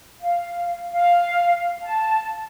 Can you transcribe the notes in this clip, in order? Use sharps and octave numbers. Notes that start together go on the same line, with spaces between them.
F5
F5
A5